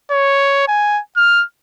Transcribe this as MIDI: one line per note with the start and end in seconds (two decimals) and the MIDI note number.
0.11 0.65 73
0.68 1.00 80
1.17 1.44 89